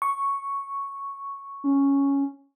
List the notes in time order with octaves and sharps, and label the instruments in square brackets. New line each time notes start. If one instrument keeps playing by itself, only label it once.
[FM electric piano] C#6
[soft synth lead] C#4